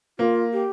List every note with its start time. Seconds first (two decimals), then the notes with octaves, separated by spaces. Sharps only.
0.19 A#3 F4
0.53 G4